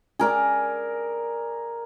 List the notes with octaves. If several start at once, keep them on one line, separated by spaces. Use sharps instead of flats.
G#4 A#4 D5